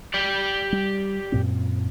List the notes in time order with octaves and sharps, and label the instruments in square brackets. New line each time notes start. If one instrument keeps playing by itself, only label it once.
[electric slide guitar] G4 D5
[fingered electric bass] G3
F#2 A#2 C4